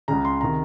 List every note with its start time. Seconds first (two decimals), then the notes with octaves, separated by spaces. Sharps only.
0.08 C#2 C#3 A#5
0.25 C6
0.41 C3 D#3 A#5